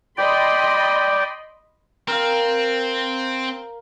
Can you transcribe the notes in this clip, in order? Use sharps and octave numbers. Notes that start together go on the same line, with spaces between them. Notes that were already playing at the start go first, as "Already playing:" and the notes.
D5 D#5 G5 B5 C6
C4 A#4 F5